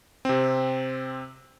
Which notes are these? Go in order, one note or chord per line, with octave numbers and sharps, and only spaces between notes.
C3 C4